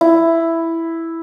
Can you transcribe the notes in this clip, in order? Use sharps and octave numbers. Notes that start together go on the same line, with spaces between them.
E4